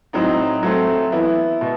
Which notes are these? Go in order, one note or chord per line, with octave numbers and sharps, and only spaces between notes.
A2 F#3 C4 D#4
F#3 A3 C4
E3 B3 E4
B2